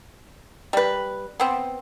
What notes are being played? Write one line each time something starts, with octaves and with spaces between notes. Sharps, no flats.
G3 B4
B3 C4